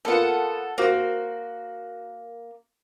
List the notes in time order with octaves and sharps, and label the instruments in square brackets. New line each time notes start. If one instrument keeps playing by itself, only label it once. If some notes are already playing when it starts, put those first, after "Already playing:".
[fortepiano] A#3 B3 F4 [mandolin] A4 F#5
[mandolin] A#3 [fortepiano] F#4 C5